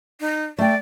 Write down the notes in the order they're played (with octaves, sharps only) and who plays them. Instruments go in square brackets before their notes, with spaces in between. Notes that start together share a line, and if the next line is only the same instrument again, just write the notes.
[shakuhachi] D#4
[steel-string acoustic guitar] A3 G5 [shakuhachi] D5